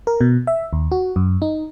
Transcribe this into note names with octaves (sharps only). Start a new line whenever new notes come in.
A#4
B2
E5
D#2
F#4
F#2
D#4